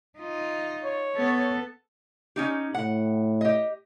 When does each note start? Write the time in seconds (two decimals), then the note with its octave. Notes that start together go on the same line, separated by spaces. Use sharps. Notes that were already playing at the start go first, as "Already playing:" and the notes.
0.19 D#4 F4
0.84 C#5
1.16 B3 A4
2.36 C#4 D#4 G4
2.74 A2 F#5
3.41 G4 D#5